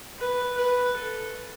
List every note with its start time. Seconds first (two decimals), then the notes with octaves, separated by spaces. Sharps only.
0.19 B4
0.57 B4
0.97 A4